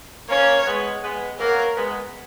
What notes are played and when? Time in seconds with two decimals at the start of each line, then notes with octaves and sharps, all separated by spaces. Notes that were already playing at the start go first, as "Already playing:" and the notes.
0.29 A#3 C#4 C#5
0.66 G#3 B3
1.03 G#3 B3
1.39 F#3 A#3 A#4
1.76 G#3 B3